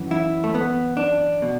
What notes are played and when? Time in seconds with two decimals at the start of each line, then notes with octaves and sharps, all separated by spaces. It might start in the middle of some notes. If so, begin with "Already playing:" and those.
Already playing: F#2 E3
0.11 E4
0.44 A3
0.54 B3
0.97 D4
1.42 B2